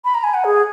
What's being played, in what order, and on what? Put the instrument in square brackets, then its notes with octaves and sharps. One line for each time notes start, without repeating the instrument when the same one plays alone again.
[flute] B5
A#5
G#5
F#5
G#4